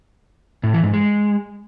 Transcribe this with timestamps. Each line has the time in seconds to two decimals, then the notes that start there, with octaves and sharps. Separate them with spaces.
0.63 A2
0.74 E3
0.84 G#2
0.94 G#3